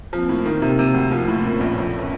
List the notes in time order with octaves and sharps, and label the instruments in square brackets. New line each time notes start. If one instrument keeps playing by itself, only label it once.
[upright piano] F3 [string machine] A#3 C4
[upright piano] A2
[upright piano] D#3 [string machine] A#3 C4
[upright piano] C3
C3
D2
F3
A2
[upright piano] A#2 [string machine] B3 C#4
[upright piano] A#1
[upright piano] F2 [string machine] A3 B3